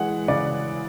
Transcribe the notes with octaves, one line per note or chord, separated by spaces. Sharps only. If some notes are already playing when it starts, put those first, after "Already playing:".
Already playing: E3 G#3 F#5
C#3 D5